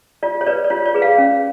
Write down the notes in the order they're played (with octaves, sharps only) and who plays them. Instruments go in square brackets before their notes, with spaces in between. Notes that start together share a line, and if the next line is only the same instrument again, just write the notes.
[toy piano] F4 D5
C#5
B4 D5
D5
F4 C#5
D5
G#4 B4
F5
C#4